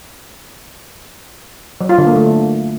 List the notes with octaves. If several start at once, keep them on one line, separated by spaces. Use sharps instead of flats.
F#3
F4
D3
A#3
A3